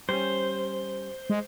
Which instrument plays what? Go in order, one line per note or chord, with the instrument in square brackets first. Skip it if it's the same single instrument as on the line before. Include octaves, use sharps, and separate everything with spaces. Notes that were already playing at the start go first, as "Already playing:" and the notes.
[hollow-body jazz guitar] G3 C#4 [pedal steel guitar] C5
[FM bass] G#3